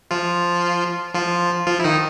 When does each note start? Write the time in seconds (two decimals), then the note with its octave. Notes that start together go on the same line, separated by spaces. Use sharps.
0.11 F3 F4
1.14 F3 F4
1.67 F3 F4
1.79 E4
1.84 D#3 D#4